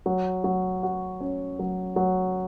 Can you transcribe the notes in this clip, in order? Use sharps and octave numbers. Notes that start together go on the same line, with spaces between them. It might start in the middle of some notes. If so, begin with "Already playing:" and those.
F#3
F#3
F#4
C#4
F#3
F#3